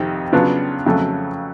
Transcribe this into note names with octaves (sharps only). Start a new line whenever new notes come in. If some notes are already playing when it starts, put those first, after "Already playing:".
Already playing: F2 C3 D#3
C#3 F#3 B3 D4 F4
F2 C#3 F#3 A3